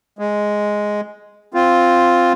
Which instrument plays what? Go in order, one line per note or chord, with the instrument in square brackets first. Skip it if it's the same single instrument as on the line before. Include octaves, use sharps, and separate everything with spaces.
[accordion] G#3
C4 F4